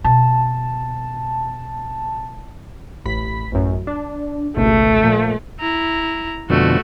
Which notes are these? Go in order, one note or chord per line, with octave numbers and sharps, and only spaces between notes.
B2 A5
A1 B5 B6
A1 F#2
D4
G#1 C#2 B2 A3
A#2 F3
E4 A#5
F2 B2 D3 A3 F#4